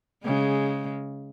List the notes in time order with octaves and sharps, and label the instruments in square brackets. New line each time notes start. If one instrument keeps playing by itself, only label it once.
[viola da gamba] C#3 G#3